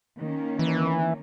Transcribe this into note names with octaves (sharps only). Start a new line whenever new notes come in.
D#3 A#3 C#4
E3